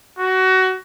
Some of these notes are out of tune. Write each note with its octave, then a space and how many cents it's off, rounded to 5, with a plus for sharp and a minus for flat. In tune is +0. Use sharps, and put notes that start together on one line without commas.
F#4 +20